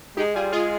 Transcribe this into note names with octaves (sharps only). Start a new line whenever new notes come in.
G#3 D#4 G4
G3 F4 G#4
G#3 F4 G#4